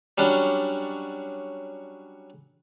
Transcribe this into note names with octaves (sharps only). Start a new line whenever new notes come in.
F#3 G3 C#4 D4